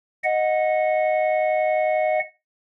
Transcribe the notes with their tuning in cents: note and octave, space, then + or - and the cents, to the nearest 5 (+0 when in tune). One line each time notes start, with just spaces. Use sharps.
D#5 +0 F#5 -15